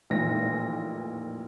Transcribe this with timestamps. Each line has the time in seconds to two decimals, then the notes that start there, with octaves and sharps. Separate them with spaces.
0.10 A1 F2 A#2 D#3 E3 A#6